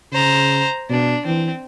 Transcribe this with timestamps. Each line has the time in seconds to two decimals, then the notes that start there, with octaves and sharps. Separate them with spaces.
0.12 C#3 C5 A#5
0.90 B2 D4
1.26 E3 C4